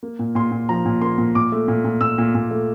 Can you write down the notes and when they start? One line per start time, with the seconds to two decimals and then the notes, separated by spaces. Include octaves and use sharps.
0.03 A#3
0.19 A#2
0.35 A#2 C6
0.51 A#2
0.69 F3 A#5
0.86 A#2
1.01 A#3 C6
1.18 A#2
1.35 A#2 D6
1.52 A3
1.68 A#2
1.85 A#2
2.01 A#2 E6
2.18 A#2
2.35 A#2
2.51 A3